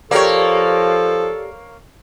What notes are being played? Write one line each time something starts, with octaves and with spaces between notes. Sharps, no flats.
F3 A#3 G4 A4 A#4 C#5 D5